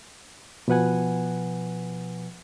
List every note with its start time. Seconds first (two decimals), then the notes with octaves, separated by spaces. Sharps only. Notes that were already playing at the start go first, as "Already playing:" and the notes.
0.68 B2 F3 B4 F#5 G#5